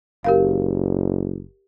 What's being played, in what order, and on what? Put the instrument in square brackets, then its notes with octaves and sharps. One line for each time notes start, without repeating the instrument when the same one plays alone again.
[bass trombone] F#1 [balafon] G4 A#4 F5